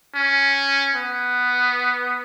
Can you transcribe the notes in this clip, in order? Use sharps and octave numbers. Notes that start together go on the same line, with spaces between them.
C#4
B3